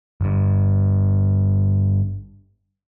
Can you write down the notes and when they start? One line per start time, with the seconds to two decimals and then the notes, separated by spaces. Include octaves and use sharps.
0.21 G1 G2